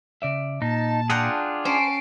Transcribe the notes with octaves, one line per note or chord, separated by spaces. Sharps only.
C#3 D5 E5
A#2 D#4 A5
D4 F4 G#4 F#5 G5 A#5
C#4 C5 A5 C7 D7